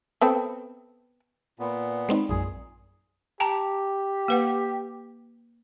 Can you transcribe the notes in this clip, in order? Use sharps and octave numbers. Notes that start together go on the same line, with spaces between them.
B3 C4 A4
A#2 B3
G#3 C4 D#4
A#1 F#2 A#2 G#4
G4 G5 A5 A#5
A#3 B4 F#5